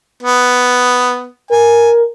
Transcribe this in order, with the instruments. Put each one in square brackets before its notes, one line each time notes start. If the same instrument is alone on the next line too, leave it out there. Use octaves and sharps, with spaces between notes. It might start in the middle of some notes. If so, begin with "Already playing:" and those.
[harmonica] B3
[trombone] A#4 [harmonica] G#5